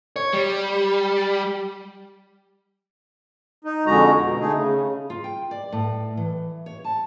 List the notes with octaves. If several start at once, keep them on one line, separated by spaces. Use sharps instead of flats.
C#5
G3
D#4
F2 D3 G#3 F#4 A#5
B2
D3 A3 D#4 G#4
C#3
F4
G5
D5
A2
E3
C#5
A5